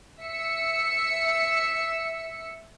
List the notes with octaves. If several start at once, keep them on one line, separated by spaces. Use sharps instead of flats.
E5 E6 C#7